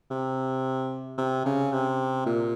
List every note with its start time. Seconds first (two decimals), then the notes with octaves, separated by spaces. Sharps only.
0.10 C3
1.18 C3
1.46 C#3
1.73 C3
2.26 A#2